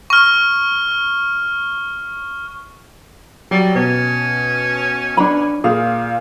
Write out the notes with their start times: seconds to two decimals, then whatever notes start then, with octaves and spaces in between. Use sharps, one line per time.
0.10 C#6 F6
3.51 F#3 G3 A6
3.75 B2 C#4
5.17 D4 B5
5.64 A#2 G#4 F5